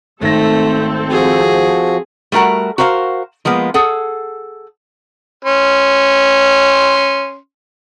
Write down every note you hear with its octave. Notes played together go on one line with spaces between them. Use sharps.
G#1 D#3 A3 C4 A4 A#6
F3 F#4 G#4
G3 A3 F#4 A#4 F#5
F#4 A#4 C5 E5 F5
F3 G#3 A#3 B3
G#4 A4 F#5
C#4 C6